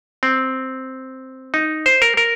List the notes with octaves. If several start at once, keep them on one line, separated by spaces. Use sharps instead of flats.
C4
D#4
C5
A#4
A#4